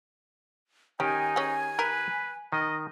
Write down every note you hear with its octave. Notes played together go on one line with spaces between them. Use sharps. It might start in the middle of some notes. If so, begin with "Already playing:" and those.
D#3 C#4 D#4 G4 G#5
C#4 G#4
A#4 B4
D#3 D#5